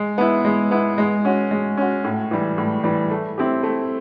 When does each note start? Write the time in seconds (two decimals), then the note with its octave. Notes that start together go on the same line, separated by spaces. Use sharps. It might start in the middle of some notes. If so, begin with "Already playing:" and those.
Already playing: G#3
0.18 B3 E4
0.45 G#3
0.71 B3 E4
0.98 G#3
1.25 C#4 F#4
1.51 G#3
1.77 C#4 F#4
2.04 A2
2.31 E3 G3
2.58 A2
2.84 E3 G3
3.11 A3
3.38 C4 E4 G4
3.63 A3